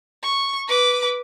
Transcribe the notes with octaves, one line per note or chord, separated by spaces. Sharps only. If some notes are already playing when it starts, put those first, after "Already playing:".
C#6
B4 D6